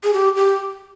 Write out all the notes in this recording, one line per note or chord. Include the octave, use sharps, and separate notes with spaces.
G#4
G4
G4